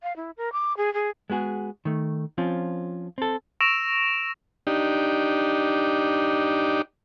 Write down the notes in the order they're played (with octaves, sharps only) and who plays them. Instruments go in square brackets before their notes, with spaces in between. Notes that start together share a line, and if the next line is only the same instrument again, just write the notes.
[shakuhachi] F5
E4
A#4
D6
G#4
G#4
[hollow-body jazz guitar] G#3 B3 F#4 G#4
D#3 A3
F3 C4 C#4 F4
C4 A4
[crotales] C#6 E6 A#6 D7 E7 F7
[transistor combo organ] D4 D#4 G4